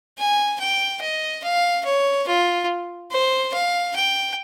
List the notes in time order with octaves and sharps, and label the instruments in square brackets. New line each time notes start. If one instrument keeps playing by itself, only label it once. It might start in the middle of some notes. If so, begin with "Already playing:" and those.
[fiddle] G#5
G5
D#5
F5
C#5
F4
C5
F5
G5